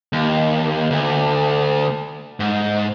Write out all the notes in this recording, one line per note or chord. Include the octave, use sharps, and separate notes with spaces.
D#2
D2
G#2